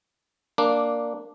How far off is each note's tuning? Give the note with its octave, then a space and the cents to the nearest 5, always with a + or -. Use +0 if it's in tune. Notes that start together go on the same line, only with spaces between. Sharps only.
A#3 +0 D4 +0